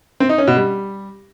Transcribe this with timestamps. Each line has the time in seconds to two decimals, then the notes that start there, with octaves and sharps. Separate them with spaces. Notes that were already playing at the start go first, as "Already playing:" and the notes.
0.20 C4
0.29 D#4
0.38 C#4
0.47 B2
0.56 G3